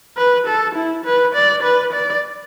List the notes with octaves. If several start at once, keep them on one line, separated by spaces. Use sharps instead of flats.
B4
A4
E4
B4
D5
B4
D5